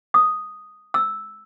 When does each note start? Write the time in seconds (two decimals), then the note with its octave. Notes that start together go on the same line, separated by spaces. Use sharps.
0.14 D#6
0.94 E6